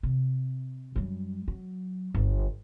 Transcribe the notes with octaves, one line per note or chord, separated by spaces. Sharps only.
C3
F#2 G3
F#3
G1